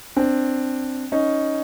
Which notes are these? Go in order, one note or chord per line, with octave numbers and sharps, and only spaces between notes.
C4 D4
C#4 D#4